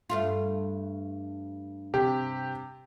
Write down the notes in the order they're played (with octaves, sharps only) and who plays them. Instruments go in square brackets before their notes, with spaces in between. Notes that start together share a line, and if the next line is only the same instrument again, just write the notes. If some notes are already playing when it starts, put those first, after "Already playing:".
[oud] G2 A3 F4
[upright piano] C3 G4